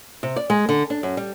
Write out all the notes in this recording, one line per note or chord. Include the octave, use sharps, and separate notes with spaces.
C3
D5
G#3
D3
D4
F#2
G3